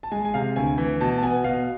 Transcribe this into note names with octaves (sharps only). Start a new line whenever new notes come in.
A5
G#3 G#5
G#5
C3 F5
D2 G#5
E3
B2 A5
A5
B3 G#5
B2 F5